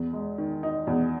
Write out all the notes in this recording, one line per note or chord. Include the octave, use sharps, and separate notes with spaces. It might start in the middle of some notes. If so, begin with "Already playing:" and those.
Already playing: E2
G#3
D#3
D#4
E2